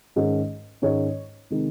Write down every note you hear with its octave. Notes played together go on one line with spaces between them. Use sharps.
G#2 D#3 G#3 C#4
G#2 D#3 G#3 C#4 C#5
C3 D#3 G#3